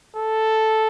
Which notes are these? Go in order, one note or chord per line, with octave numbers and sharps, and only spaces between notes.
A4